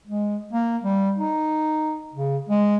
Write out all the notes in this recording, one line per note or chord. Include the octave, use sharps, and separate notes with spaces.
G#3
A#3
G3
D#4
C#3
G#3